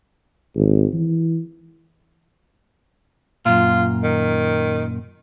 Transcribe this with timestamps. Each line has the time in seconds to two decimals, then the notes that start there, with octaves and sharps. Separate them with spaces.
0.56 G#1
0.93 E3
3.46 F#2 A#2 F4
4.03 D#3